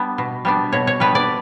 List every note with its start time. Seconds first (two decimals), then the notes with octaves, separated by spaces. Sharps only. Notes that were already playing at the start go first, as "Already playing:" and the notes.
Already playing: G3 B3 D4
0.18 B2
0.45 G3 B3 D4
0.72 B2 C#5
0.87 C#5
1.00 G3 B3 D4 B4
1.15 D5